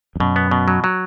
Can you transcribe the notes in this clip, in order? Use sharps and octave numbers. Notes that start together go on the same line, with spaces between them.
F2
F#2 B2
B3
B2
F#3
F#3